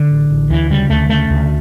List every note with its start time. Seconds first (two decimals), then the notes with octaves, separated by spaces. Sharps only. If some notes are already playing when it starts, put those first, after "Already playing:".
Already playing: D3
0.11 A1
0.30 A1
0.50 D2 E3
0.70 C#3 G3
0.90 D2 A3
1.10 C#3 A3
1.30 D2